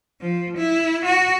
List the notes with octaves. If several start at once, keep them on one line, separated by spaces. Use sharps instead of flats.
F3
E4
F#4